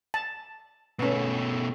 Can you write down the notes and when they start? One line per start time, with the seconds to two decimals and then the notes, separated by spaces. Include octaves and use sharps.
0.14 A5
0.99 B2 A3 B3 C#4